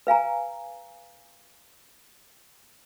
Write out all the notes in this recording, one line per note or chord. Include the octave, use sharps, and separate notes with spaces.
B4 F5 G#5 A#5